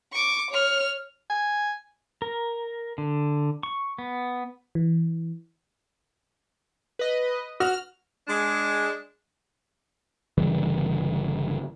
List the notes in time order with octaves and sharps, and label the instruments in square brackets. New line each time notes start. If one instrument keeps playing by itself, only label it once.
[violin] C#6 D6
C#5 F6
[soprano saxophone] G#5
[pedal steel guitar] A#4
D3
C#6
B3
[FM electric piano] E3
[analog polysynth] B4 D#5
[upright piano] F#4 [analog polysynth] F6
[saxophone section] G#3 D4
[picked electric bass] G1 C#3 E3 G3